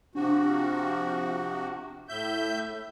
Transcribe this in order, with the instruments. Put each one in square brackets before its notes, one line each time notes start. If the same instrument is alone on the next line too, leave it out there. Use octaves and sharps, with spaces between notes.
[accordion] C3 F3 F#4 [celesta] D4
[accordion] A2 E5 G6